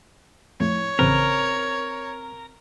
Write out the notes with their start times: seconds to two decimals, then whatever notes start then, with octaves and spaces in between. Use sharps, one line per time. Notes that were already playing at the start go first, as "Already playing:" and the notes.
0.60 F2 A2 C#5
0.99 A1 C#3 C4 A#4 B4